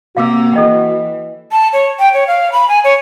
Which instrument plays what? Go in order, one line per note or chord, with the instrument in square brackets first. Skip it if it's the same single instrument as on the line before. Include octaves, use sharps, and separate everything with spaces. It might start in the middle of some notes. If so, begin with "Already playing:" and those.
[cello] C3 A#3 [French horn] F#4 [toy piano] F5 D6 E6
[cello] E3 [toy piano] A4 D#5 G5
[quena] A5
C#5
G5
C#5
F5
B5
G#5
C#5